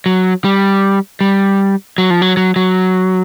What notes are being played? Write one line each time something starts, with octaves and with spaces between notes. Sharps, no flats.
F#3
G3
G3
F#3
F3
F#3
F#3
F#3